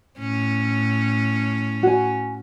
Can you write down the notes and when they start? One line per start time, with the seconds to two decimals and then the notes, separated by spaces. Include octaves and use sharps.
0.19 A2 C#4
1.83 F#4 G#5